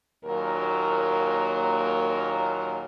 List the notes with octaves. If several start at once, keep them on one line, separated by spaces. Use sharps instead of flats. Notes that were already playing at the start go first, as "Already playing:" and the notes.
D#2 A#2 F#3 A#3 A#4